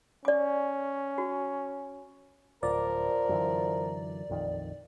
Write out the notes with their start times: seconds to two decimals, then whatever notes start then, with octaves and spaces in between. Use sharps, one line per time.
0.25 C#4 D5 D6
1.18 F#4
2.63 D1 F3 A#4 D5
3.29 F#2 D3 E3
4.29 A#1 F2 D#3